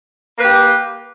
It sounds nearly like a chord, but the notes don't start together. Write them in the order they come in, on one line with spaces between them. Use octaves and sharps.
A#3 B4 G4